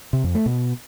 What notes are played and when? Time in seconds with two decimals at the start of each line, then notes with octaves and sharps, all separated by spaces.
0.13 C3
0.24 F2
0.35 A3
0.46 B2